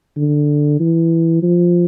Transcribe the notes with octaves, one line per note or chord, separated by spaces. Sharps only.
D3
E3
F3